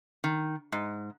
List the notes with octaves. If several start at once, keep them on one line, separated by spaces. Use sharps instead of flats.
D#3
G#2